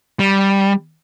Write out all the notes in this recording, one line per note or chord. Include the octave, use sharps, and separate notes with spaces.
G3